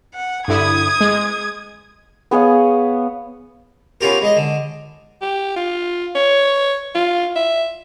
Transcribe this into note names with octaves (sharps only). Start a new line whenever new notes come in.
F#5
G2 D3 E4 D#6 G#6
G#3
B3 G#4 C#5 F5
B3 C#4 F4 G4 A#4
G#3 D#5
D3
G4
F4
C#5
F4
E5